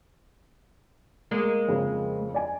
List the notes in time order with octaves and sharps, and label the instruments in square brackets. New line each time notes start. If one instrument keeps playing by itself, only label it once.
[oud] G#3 A#3
[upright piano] F2 C#3
D5 G#5